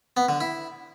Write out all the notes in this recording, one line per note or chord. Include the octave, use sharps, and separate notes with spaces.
B3
D3
E4